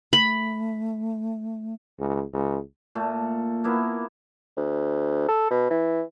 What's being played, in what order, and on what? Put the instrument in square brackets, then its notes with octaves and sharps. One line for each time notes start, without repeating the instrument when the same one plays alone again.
[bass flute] A3 [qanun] B5
[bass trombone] C#2
C#2
[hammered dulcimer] A#2 A3
A#3 B3 E4 A#4
[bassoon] D2
A4
B2
E3